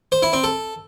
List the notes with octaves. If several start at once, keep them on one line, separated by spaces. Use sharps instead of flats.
C5
E4
C4
A4